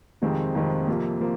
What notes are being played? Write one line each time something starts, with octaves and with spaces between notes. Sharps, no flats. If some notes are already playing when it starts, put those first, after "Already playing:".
F2 C3 D#3 G#3 C4
F2 C3 D#3 G#3 C4
F2 C3 F3 A#3
F3 A#3